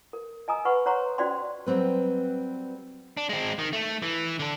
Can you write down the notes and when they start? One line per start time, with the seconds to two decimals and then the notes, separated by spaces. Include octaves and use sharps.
0.13 A#4
0.48 D#5 G#5 A#5 D#6 E6
0.65 B4 F#5 B5 C#6
0.86 C5 C#5 F#5 A#5 C6 C#6
1.18 C#4 F#4 C5 D5 G5 C6
1.66 F#3 G3 C4 B4
3.17 D4
3.29 G#3 C4
3.59 D#3
3.73 A3
4.02 E3
4.39 D3 D4